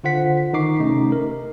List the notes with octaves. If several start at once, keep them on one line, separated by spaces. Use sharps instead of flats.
D3 F4 C5 F#5 B6
D#3 D#4 C#6 D6 C7
C3 A3 C#4 D#4
A#4